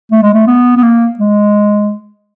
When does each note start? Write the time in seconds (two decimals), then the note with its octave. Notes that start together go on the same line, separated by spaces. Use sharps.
0.12 A3
0.23 G#3
0.34 A3
0.47 B3
0.77 B3
0.83 A#3
1.19 G#3